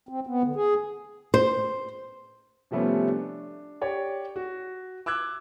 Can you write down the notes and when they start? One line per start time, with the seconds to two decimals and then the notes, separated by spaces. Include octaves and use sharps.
0.09 C4
0.27 B3
0.43 D3
0.56 G#4
1.34 C5
2.71 C3 F3 G3 A3 B3 C#4
3.08 D4
3.81 G4 C#5 D5
4.36 F#4
5.06 D6 E6 F#6 G#6